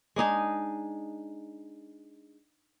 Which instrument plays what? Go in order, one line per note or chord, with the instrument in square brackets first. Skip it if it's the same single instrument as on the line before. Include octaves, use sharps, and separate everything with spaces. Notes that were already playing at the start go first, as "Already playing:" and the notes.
[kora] G#3 D4 D#4 G#4